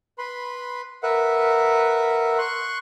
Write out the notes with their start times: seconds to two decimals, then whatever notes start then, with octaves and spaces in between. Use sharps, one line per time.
0.18 B4 B5 C6
1.03 A#4 B4 E5 F#5
2.38 C6 C#6 F#6